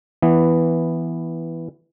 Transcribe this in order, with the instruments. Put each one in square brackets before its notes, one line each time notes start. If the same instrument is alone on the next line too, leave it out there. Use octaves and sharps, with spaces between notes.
[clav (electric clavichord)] E3 B3